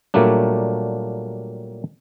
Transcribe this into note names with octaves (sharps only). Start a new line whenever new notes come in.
A#2 F#3 G3 A3 A#3 D4